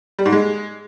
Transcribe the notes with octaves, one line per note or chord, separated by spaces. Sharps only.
G3
G#2
G#3